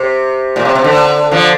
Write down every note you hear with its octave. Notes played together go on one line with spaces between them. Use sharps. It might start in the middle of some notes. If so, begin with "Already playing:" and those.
Already playing: C3
A#2
C3
C3
D3
D3 F3